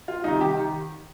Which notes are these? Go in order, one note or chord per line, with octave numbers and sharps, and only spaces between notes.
F4
C2 C3 D#3 D#4
G4
D#3